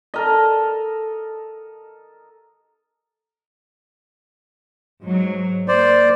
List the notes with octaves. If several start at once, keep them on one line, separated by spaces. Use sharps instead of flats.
A4 A#4 D#5
G#2 F#3
A#3 C5 D5